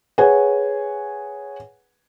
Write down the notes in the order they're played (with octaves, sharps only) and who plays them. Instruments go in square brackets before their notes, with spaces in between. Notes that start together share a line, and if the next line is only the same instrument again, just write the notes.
[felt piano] G#4 B4 C#5 F#5 G#5